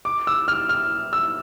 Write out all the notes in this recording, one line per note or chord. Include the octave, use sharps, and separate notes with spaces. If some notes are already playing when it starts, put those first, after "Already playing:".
D6
E6
F6
F6
E6